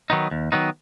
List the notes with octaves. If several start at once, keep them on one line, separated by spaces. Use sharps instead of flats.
D#3 F#3 B3 D#4
D#2
D#3 F#3 B3 D#4